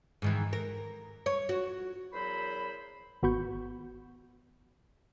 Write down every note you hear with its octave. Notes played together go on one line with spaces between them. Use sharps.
G#2 D#3 E3
A#4
C#5
F#4
E2 F#3 A#4 C5 B5
G#1 B3 F#4 B5 C#6 G6